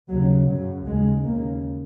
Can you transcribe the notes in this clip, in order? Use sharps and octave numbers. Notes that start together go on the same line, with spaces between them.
D#2 C#3 F#3
F#2 C#3 F#3
D#2 C#3 G#3
D#2 C#3 A#3